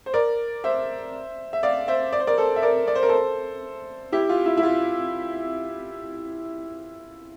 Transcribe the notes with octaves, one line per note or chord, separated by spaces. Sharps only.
C5
A#4 D5
C5 E5
E5
D5 F5
C5 E5
D5
C5
A#4 D5
A4 C5
E5
A#4 D5
D5
C5
A#4
A4 C5
E4 G4
F4
E4
E4
F4